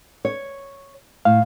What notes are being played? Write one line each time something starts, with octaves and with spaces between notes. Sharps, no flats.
C#5
A2 F5